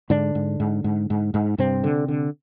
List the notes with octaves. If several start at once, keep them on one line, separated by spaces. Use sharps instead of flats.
G#2 D3 D4
G#2
G#2
G#2
G#2
G#2
G2 C3 C4
D3
D3